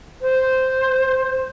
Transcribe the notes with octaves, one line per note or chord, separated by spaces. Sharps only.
C5